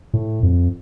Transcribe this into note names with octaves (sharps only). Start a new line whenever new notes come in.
A2
F2